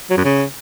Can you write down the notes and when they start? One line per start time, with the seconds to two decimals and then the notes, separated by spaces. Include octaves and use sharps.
0.10 F#3
0.17 F#2
0.24 C#3